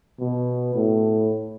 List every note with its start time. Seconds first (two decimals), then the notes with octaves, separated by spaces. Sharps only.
0.20 B2
0.75 A2